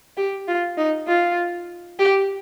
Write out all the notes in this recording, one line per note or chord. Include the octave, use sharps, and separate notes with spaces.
G4
F4
D#4
F4
G4